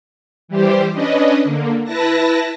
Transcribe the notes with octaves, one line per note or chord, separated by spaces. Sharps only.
E3 G3 G4 C5
C#4 D4 B4 D#5
D3 A#3
E4 B4 A5 A#6